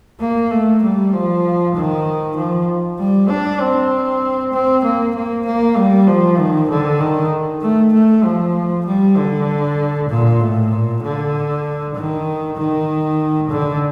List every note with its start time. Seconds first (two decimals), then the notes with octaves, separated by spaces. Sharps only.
0.20 A#3
0.51 A3
0.82 G3
1.13 F3
1.75 D#3
2.36 F3
2.99 G3
3.29 D4
3.60 C4
4.53 C4
4.84 A#3
5.15 A#3
5.45 A#3
5.77 G3
6.07 F3
6.38 D#3
6.70 D3
7.00 D#3
7.62 A3
7.93 A3
8.24 F3
8.86 G3
9.17 D3
10.09 A#2
10.40 A2
10.71 A#2
11.02 D3
11.94 D#3
12.57 D#3
13.49 D3